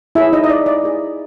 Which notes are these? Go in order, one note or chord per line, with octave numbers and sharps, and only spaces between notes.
E4 G#4 C#5 E5
D#4 D#5
D#5
D5
D5
E4 G#4 C#5